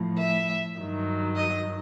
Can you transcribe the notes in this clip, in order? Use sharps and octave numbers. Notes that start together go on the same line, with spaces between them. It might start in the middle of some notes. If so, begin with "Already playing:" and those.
Already playing: A2 F3
E5
G2 D#3 F#3
D#5